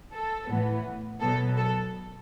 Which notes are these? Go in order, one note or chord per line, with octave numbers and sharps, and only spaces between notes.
A4
A2 E3 B3
B2 F#3 B3 A4
A4